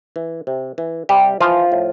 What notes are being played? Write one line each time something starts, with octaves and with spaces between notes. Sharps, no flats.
E3
C3
E3
C3 G3 G4
E3 F3 F4
A2